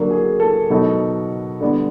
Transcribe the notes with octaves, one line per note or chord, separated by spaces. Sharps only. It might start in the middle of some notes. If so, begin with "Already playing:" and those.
Already playing: D3 F#3 A#3 D4
G#4
A4
B2 F#3 B3 D#4 A4
D3 G3 B3